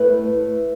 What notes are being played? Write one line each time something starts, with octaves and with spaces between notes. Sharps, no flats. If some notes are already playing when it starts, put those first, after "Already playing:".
Already playing: A2 A3 B4